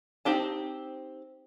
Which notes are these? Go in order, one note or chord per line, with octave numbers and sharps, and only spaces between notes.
C4 D#4 G4 A5